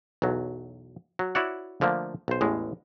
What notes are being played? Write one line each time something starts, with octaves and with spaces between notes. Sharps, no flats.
B1 E2 F#3
F#3
E4 F#4 C#5 D5 F#5
D3 F3 A3 A#3
B1 C5
A1 E2 A2 G#3